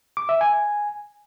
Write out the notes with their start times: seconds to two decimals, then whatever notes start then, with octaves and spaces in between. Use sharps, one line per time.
0.17 D6
0.29 E5
0.41 G#5